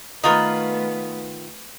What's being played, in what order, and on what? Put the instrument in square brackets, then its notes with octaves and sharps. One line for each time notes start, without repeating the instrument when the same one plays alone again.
[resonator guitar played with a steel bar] D#3 F4 B4 [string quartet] A3 B3 [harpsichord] D#5